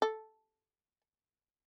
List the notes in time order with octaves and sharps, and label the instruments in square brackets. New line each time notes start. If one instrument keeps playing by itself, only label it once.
[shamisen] A4